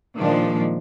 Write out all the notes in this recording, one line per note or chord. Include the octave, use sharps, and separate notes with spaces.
A#2 D#3 F3 G#3 A#3 D4